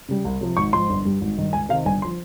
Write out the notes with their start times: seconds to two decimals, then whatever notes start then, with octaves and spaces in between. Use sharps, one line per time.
0.09 C#3 G3
0.24 C2
0.41 C3 F3
0.57 G#1 C#6
0.73 G#2 F3 C6
0.90 G1
1.05 G2 G3
1.21 G#1
1.37 G2 D#3
1.53 C#2 G#5
1.69 C3 D#3 F5
1.85 G1 G#5
2.02 F3 C6